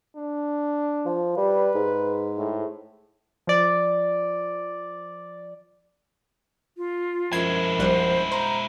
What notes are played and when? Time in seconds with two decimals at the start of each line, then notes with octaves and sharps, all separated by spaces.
0.16 D4
1.05 F3
1.37 G3 B4
1.75 G#2
2.38 A2
3.47 F3 D5
6.77 F4
7.32 F#2 F3 G#3 E4 G#6 C7
7.79 A#1 G3 C5 F#5
8.32 C5 A#5